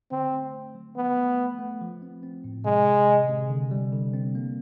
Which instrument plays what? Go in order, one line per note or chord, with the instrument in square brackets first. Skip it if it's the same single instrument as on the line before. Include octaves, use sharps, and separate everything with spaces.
[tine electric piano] D3 [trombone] C4
[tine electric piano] A3
A3
F#3
[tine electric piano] F3 [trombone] B3
[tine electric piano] A3
A3
A3
F3
C4
C4
A2
[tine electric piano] C3 [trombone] G#3
[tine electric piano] C3
D#3
C3
D3
G3
D3
C4
A#3